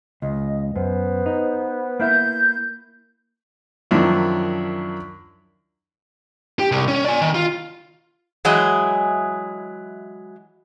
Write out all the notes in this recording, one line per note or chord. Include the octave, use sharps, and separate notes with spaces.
C#2 D#5
F#2 B3 C5
D#4
A#3 E4 E5 G6
F#2 D#3 F3 D4 E4
G4
C2
C#4
D5 G#5
D#3
F4
E3 F#3 G#3 E4 G#4 D#5